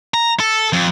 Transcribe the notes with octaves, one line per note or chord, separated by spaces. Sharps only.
A#5
A4
F2